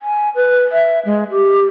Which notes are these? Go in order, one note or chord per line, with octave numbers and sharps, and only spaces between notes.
G#5
B4
E5
G#3
G4